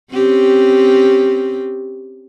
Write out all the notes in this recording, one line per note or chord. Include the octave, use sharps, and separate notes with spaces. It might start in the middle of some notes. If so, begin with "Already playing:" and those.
C4 C#4 G4